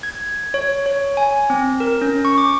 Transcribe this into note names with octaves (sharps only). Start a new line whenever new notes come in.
G#6
C#5
C#5
G#5
C4
A#4
C#4
C#6
D6